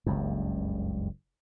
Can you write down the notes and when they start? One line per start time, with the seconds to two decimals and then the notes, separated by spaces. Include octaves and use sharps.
0.06 F#1 C#2 G2